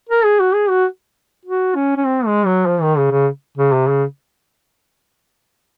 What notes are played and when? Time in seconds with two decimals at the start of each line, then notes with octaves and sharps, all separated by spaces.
0.09 A#4
0.24 G#4
0.40 F#4
0.54 G#4
0.69 F#4
1.45 F#4
1.75 C#4
1.97 C#4
2.06 C4
2.26 G#3
2.46 F#3
2.66 F3
2.82 D#3
2.97 C#3
3.11 C#3
3.58 C#3
3.73 C3
3.88 C#3